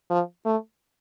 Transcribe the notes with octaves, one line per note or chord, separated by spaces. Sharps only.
F3
A3